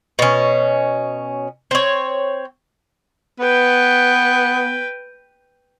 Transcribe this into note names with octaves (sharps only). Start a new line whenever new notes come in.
B2 C#4
C4 C#5
B3 B4 G5